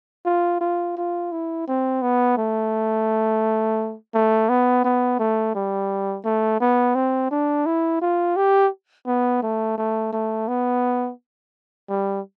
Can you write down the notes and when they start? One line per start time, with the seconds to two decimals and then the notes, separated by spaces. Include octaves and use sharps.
0.26 F4
0.61 F4
0.97 F4
1.32 E4
1.68 C4
2.02 B3
2.37 A3
4.14 A3
4.49 B3
4.85 B3
5.20 A3
5.55 G3
6.25 A3
6.61 B3
6.95 C4
7.31 D4
7.66 E4
8.02 F4
8.36 G4
9.07 B3
9.43 A3
9.78 A3
10.13 A3
10.48 B3
11.89 G3